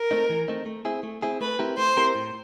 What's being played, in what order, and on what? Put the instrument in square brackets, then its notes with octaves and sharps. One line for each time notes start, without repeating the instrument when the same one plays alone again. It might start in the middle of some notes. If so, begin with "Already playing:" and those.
Already playing: [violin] A#4
[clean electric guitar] A3 C4 D#4
E3
A3 C4 D#4
A3
C4 E4 G#4
A3
C4 E4 G#4
[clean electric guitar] A3 [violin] B4
[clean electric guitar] C4 E4 G4 A#4
[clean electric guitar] A3 [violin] C5
[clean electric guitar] C4 E4 G4 A#4
A2